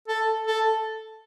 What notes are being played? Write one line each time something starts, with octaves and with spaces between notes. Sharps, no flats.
A4
A4